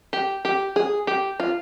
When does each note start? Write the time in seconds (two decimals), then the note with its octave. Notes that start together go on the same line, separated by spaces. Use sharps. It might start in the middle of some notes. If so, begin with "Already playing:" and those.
0.13 G4
0.45 G4
0.76 G#4
1.07 G4
1.40 F4